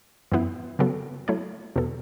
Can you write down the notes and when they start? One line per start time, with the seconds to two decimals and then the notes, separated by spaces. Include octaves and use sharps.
0.32 F#2 E3 B3 E4 B4
0.79 C#3 F#3 B3 F#4 A4
1.28 F#3 A3 E4 C#5
1.76 E2 B2 B3 A4